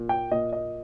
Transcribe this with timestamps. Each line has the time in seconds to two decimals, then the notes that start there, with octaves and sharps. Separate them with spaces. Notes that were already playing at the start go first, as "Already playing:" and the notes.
Already playing: A#2
0.09 G5
0.31 A#2 D#5
0.53 D#5